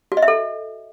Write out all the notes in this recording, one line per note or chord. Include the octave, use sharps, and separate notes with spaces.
F#4
D#5
E5
A4